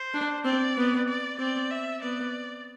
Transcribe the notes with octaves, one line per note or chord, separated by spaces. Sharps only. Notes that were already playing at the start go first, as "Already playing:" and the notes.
Already playing: C5
D4
C4 D5
B3
D5
C4 D5
E5
B3 D5